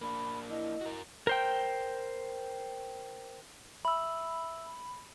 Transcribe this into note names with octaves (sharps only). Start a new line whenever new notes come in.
A#3 D4 B5
E4 D#5
F#4 A#4
A#4 C5 G5
E5 B5 E6